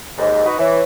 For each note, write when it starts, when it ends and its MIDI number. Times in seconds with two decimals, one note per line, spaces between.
0.18 0.42 39
0.18 0.42 44
0.18 0.48 75
0.46 0.57 63
0.46 0.57 66
0.46 0.57 71
0.59 0.81 52
0.59 0.84 73